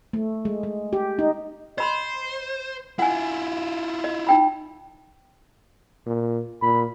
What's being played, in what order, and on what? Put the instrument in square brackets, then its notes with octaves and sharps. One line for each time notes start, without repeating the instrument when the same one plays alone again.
[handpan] A3
G#3
G#3
G4
D#4
[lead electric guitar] C5 [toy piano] D#5 B5 C6
[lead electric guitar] E4 F4 [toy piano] F#5 G#5
[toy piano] D#5
D#4 G5 B5
[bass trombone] A#2
[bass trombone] A#2 [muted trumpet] B5